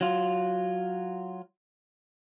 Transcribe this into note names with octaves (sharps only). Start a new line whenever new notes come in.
F#3 F4